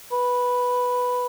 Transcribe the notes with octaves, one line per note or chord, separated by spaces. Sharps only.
B4